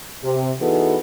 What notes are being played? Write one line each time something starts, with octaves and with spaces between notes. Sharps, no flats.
C3
E3 B3 D#4 F#4 G#4 A4